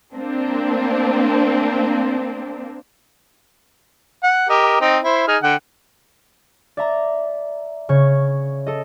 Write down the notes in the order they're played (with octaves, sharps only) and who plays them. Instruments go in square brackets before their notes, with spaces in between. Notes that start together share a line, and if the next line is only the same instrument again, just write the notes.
[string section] A#3 C4 D4
[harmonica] F#5
G4 A#4 D#5
C4 D#4 G5
E4 C5
D#4 G#4 F6
D3 F#5 G5
[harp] D5 E5 A#5
C#3 C#5
A4 D#5